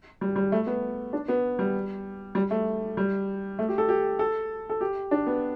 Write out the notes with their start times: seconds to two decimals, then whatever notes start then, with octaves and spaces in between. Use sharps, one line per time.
0.21 G3
0.36 G3
0.52 A3
0.67 B3
1.13 D4
1.28 B3
1.59 G3
2.35 G3
2.51 A3
2.97 G3
3.59 A3
3.68 G4
3.78 A4
3.89 G4
4.19 A4
4.70 A4
4.81 G4
5.11 D4
5.27 B3